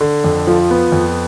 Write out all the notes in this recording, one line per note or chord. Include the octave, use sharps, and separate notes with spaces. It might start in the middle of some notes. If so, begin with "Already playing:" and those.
D3
F2
F3
B3
F2